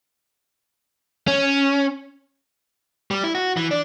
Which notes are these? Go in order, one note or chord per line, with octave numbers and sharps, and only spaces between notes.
C#4
G3
E4
F#4
E3
D4